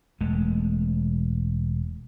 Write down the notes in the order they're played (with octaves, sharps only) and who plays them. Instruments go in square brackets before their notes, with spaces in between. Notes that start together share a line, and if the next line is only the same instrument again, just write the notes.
[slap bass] E1 G#3 A3